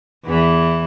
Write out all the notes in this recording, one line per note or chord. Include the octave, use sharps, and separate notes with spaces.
E2 E3